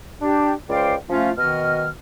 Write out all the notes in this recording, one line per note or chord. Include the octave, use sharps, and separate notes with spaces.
D4 G4
C#2 C5 D5 F5 G5 D6
F3 A3 C#4 F4
B2 D#3 F#4 D#5 F6